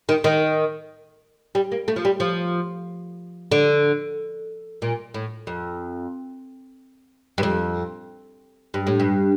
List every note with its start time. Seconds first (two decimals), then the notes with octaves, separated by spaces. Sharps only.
0.09 D#3
0.24 D#3
1.55 G3
1.72 A#3
1.88 A3
1.96 F3
2.05 G3
2.20 F3
3.52 D3
4.82 A#2
5.14 A2
5.47 F2
7.38 G2
7.43 F2
8.74 G2
8.87 A2
9.00 G2